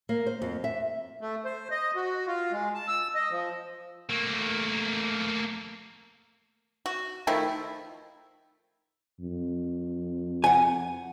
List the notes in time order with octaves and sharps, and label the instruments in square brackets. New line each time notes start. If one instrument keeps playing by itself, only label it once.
[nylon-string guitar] A#3
C5
F2
E5
[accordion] A3
C5
D#5
F#4
F4
G#3
A5
E6
D#5
F3
[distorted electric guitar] A3 A#3
[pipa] F#4
D#3 F3 A3 E4
[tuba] F2
[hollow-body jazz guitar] F#5 G#5